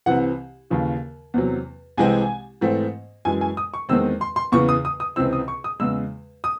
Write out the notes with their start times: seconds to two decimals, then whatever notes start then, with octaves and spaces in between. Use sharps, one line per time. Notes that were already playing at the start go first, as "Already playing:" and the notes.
0.06 C2 C3 E3 F#5
0.70 D#2 C#3 E3
1.34 E2 C3 F#3
1.97 C2 C3 E3 G#3 C4 G#5
2.61 G#2 E3 A3 C4
3.25 F#2 E3 G#3 G#5
3.41 G#5
3.57 D#6
3.74 C#6
3.89 E2 D#3 G#3 C4 E6
4.21 C6
4.36 C6
4.52 E2 C#3 E3 C#6
4.69 D#6
4.85 D#6
5.00 D#6
5.16 C#2 C3 E3 C4 E6
5.33 D#6
5.48 C#6
5.64 D#6
5.80 E2 C#3 G#3 E6
6.44 D#6